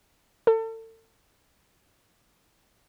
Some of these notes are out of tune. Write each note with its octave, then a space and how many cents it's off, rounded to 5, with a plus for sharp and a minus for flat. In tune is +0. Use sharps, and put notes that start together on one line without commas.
A4 +35